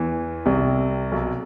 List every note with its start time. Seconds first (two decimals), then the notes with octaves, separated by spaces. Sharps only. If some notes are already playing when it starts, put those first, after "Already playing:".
Already playing: E2 E3
0.46 C2 C3
1.12 B1 B2